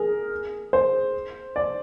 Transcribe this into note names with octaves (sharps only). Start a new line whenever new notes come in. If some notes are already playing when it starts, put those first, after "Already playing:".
Already playing: G#4 A#4
C5
D5